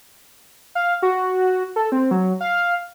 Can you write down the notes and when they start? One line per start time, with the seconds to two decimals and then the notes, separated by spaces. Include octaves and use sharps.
0.75 F5
1.02 F#4
1.76 A4
1.92 C4
2.11 F#3
2.41 F5